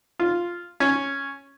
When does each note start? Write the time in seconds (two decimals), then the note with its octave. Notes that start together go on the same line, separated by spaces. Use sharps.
0.20 F4
0.80 C#4